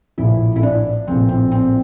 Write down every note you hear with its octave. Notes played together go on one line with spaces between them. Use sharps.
A#1 A2 F3 E4
E4
D4
A#1 A2 F3 C4
C4
C4